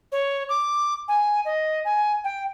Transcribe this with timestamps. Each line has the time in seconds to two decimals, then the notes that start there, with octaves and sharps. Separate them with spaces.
0.12 C#5
0.49 D6
1.08 G#5
1.45 D#5
1.85 G#5
2.24 G5